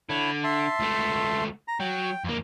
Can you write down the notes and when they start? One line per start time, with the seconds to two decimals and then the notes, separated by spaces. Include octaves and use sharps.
0.09 D3 E4 C#5 B5
0.44 E5 A5 C6
0.80 C#2 A3
1.68 A#5
1.80 F#3 G5
2.24 F2 A#3